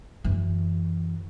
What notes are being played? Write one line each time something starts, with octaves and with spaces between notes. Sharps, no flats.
F#2 E3